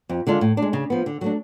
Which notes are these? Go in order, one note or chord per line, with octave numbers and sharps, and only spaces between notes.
F2
D3 G#3 D4 F4
A2
D4
G#3
C#3
F3 B3
D3
F#3 A3 D4